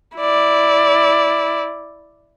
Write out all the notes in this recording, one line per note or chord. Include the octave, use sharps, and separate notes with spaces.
E4 D5